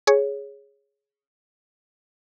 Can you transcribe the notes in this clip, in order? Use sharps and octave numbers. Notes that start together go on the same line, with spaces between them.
G#4 C#5